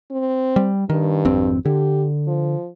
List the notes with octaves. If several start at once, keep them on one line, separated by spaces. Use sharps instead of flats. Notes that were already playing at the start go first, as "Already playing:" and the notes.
C4
G3
G2 D#3
G#1 F2 C4
D3 G4
F3